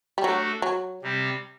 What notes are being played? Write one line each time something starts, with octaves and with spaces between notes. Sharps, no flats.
G3
F#3 A3 D4 F#4 A4
F#3
C3 G3 C4 G4